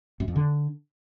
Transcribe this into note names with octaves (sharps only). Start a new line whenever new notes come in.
F#2
F2
D3